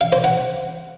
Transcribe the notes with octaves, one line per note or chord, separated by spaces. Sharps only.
F5
C5
F#5